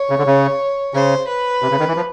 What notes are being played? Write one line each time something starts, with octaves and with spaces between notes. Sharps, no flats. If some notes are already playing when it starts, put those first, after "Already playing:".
Already playing: C#5
C#3
D3
C#3
C#3 C5
B4
C3
C#3
D#3
E3
F3